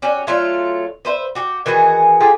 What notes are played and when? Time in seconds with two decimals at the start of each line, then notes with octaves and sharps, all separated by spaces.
0.02 C#4 F#4 G4
0.27 F#3 A3 F4
1.05 B4 C5 E5
1.35 F#4 G4
1.66 D#3 E3 F#4 G#4
2.20 A3 F4 G4 G#4